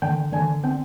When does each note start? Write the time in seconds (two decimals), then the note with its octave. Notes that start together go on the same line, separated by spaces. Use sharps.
0.02 D3 G5
0.32 D3 G#5
0.63 C4 G5